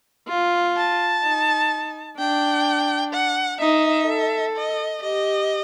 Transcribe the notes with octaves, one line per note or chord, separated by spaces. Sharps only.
F4
A5
D#4
D4 G5
F#5
D#4 E5
A4
D#5
G4 D#5